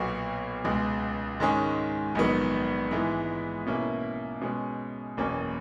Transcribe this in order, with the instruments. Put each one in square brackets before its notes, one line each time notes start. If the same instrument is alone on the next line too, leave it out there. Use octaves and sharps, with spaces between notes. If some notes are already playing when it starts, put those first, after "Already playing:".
Already playing: [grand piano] B1 A#2 F#3 B3 F#4
C#2 B2 G#3
G#2 D#3 G#3 C#4 G#4
A#1 G#2 D#3 F#3 B3
G#2 E3 G#3 B3
B2 A#3 C#4 E4
B2 G#3 C#4
F#1 E2 B2 A#3 C#4